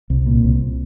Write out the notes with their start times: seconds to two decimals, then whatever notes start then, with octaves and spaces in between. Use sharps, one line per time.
0.10 C2
0.26 A#2
0.44 C2